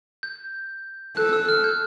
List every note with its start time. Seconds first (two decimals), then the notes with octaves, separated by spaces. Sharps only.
0.23 G6
1.17 A4 F#6
1.33 E6
1.49 F6
1.64 G6